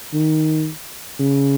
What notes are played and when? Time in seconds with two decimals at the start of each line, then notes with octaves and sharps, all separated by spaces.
0.13 D#3
1.20 C#3